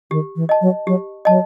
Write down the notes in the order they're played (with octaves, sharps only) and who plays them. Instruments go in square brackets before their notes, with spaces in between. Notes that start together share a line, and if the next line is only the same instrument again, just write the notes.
[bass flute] D#3 [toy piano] G4
[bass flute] E3
[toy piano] D#5 A5
[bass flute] F#3
[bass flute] F#3 [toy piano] G4
[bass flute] F#3 [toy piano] D#5 A5